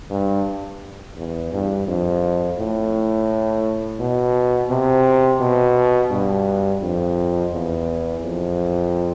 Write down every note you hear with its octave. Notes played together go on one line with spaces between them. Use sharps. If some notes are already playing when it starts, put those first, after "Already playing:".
G2
E2
G2
F2
A2
B2
C3
B2
G2
F2
E2
F2